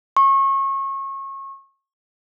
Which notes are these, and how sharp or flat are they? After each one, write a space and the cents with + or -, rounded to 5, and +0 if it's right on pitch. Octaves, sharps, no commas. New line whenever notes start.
C#6 -30